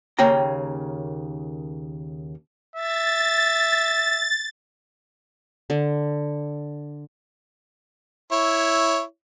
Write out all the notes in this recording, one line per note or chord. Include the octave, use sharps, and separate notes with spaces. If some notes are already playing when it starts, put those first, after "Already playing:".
D#2 C#3 A#3 C#4 G5 A#5
E5 A6
D3
E4 C#5